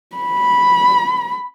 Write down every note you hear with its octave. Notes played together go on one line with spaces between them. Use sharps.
B5